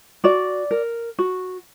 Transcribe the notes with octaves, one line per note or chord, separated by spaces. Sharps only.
F#4 D5
A#4
F#4